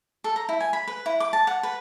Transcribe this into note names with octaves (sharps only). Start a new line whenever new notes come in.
A4
A#5
E4
G#5
B5
B4
E4
D6
A5
F#5
B4